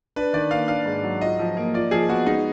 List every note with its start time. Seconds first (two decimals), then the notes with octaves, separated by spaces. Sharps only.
0.16 D4 B4
0.33 D#3 D5
0.51 A#3 F5
0.68 D4 F5
0.86 G#2
1.03 F#3
1.21 F4 D#5
1.39 F3
1.57 A#3
1.74 F4 D5
1.91 F3 G#4
2.09 B3 F#4
2.26 G#3 D#4